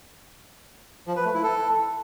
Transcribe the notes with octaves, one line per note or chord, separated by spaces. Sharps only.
F3
B4
A3
E4
A4